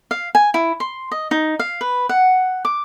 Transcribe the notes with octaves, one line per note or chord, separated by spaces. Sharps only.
F5
G#5
E4
C6
D#5
D#4
F5
B4
F#5
D6